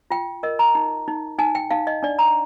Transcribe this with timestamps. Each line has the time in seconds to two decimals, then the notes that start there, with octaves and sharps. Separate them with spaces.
0.11 F4 G5
0.43 A#4 D#5
0.59 A#5
0.75 D#4
1.08 D#4
1.39 D#4 G#5
1.55 G5
1.71 D#4 F5
1.87 D#5
2.03 D4 D5
2.19 A#5